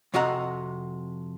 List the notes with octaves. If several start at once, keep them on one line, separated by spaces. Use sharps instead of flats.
F2 C3 F#4 D#5 F#5 A#5